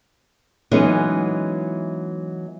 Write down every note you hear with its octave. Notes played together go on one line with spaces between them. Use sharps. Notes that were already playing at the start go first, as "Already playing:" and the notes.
E3 F#3 G#3 B3 C#4 D#4